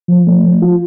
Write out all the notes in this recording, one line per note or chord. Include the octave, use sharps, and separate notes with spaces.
F3
A3
F3
F4